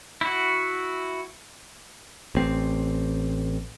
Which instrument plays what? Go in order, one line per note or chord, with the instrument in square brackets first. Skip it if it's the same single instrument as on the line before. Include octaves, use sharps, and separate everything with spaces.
[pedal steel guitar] E4 F#4
[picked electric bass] A1 C4